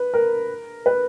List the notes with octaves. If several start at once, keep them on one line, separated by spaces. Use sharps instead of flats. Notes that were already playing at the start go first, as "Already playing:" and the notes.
Already playing: B4
A#4
B4